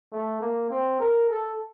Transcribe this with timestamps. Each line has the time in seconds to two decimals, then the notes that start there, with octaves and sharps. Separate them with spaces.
0.12 A3
0.41 A#3
0.70 C4
1.00 A#4
1.30 A4